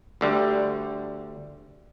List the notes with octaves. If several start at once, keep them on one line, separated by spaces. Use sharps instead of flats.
D2 D3 G3